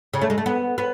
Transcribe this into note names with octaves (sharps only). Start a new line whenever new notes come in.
C#3
A3
G#3
A3
B3
B3